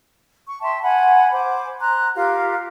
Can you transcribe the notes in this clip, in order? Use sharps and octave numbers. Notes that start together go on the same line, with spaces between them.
C#6
E5 G5 A5 C6
F#5 G#5 B5
C5 D6
A#5 C6 F#6
F4 G4 A#4 F5